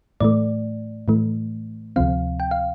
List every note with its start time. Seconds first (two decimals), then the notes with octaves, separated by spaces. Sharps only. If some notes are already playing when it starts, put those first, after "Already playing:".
0.20 A2 E3 A3 D5
1.08 A2 E3 A3
1.96 D2 C3 F3 C4 F5
2.40 G5
2.51 F5